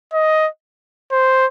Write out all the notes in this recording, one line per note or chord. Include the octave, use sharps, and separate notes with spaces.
D#5
C5